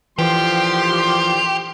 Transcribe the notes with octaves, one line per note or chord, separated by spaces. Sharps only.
A#2 D3 E3 F3 G4 C6